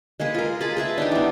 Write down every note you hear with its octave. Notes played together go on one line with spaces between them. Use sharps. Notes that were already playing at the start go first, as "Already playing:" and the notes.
G#3 A#3 G#4 B4
F4 A#4
G#4 B4 A5 B5
G#4 B4 E5 A5
D4 D#4 G4
E3 B3